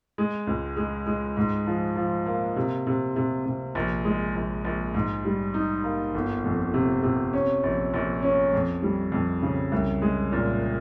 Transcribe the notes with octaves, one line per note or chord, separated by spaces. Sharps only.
G#3
C#2
G#3
G#3
G#2
F3
F3
A#3
C3
C3
C3
C3
A#1
G#3
A#1
A#1
G#2
G3
D#4
A#3
G1
F2
C3
C3
C#4
A#1
A#1
C#4
F2
G3
F2
C#3
C2
G#3
A#2